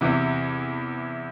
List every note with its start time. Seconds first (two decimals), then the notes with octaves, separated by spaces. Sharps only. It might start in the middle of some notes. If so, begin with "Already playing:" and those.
0.01 E2 C3 E3